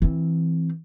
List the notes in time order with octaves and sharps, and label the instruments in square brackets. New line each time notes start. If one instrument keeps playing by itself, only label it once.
[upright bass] E3 C4